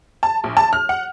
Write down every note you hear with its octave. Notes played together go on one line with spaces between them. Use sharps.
A5
A#1
A5
F6
F#5